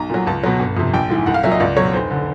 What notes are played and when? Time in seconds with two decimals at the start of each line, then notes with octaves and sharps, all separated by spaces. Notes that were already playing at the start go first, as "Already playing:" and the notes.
Already playing: B1 A#5
0.10 A#2 F#3
0.27 C#2 A5
0.44 B2 F#3
0.60 G1
0.77 F2 C3
0.94 A#1 G5
1.09 G#2 E3
1.26 C2 F#5
1.34 F5
1.43 A#2 F#3 E5
1.51 D#5
1.60 C#2 D5
1.77 B2 F#3 C#5
1.93 F1 C5
2.11 D3